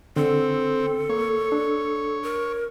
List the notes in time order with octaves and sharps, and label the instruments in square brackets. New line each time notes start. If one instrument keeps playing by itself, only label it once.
[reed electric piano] D3 [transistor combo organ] C4 [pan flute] A4
[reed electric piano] A#3 [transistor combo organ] C#5
[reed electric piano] D4
[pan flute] A#4